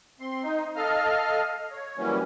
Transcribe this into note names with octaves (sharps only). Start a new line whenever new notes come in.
C4 C6
D#4
A4 D#5 F5 F6
C#5
E3 F#3 G3 A#3 C#4